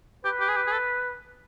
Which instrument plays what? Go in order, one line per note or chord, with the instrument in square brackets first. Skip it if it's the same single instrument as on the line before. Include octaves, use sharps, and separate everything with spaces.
[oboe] G4 [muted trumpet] B4
[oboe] G4
G#4
G4
G#4
A4